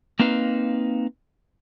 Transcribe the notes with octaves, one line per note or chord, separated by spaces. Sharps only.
A#3 C4 D#4 B4 F5